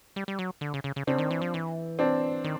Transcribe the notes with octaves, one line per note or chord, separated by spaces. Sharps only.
G3
G3
F#3
D3
C#3
C#3
C#3
C#3 C4 D4
D#3
E3
F3
E3
C4 D4
D#3